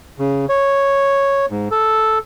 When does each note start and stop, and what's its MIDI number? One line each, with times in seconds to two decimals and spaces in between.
0.19 0.45 49
0.49 1.46 73
1.50 1.68 44
1.71 2.19 69